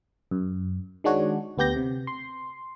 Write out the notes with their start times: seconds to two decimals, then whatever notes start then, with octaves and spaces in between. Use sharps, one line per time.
0.31 F#2
1.04 D#3 G#3 D4 F#4 C#5
1.58 D2 B3 G4 G6 A#6
1.76 C3
2.07 C6